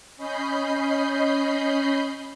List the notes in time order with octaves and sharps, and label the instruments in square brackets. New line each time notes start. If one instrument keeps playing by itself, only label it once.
[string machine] C#4 D#5 B5 G6 C7